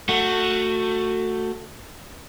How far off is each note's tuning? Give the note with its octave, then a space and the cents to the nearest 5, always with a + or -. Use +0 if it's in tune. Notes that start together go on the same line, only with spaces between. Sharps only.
A3 +20 F#4 +0